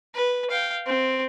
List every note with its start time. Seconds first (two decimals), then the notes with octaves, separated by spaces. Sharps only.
0.15 B4
0.51 F5 G5
0.86 C4